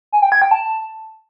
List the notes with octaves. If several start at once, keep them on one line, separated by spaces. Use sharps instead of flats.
G#5
G5
G#6
G5
A5